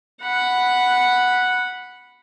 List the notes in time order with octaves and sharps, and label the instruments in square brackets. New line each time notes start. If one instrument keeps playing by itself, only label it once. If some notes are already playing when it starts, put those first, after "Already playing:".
[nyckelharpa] F#5 B5